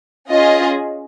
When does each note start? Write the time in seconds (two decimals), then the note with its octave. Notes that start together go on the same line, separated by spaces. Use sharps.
0.29 C#4 F4 G#4 D#5